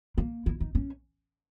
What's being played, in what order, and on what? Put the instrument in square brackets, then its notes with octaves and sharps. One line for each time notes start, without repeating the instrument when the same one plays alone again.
[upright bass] A#3
E4
D#4
C#4